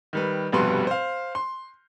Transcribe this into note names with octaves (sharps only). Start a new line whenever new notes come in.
D#3 G3 B4
F1 G2 B2 B4 C6
C5 F5
C6